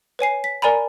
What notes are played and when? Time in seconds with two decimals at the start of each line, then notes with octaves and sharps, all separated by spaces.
0.19 B4 C#5 G#5 C7
0.44 B6
0.62 A#4 D5 G#5 A#5 B5